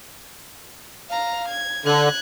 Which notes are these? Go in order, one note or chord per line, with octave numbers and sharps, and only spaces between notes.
F5 A#5
G#6
D3 F#6 G#6